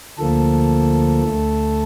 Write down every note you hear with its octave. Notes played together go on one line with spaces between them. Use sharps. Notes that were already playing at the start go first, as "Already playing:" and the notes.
D2 D3 F3 A#3 A4
D2 D3 A3